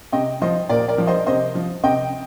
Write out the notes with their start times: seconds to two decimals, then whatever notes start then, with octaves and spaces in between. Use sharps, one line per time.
0.12 C3 D#5 G5
0.42 F3 C5 D#5
0.69 A#2 A#4 D5
0.88 A#4 D5
0.98 F3
1.07 C5 D#5
1.26 C3 C5 D#5
1.55 F3
1.83 C3 D#5 G5